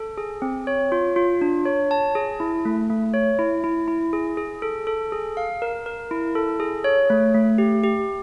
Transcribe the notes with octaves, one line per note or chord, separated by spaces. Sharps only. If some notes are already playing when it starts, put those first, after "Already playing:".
Already playing: A4
G#4
C4
C#5
F4
F4
D4
C#5
A5
G#4
E4
A3
A3
C#5
E4
E4
E4
G#4
G#4
A4
A4
G#4
F5
A#4
A#4
E4
A4
G#4
C#5
A3
A3
G4
G4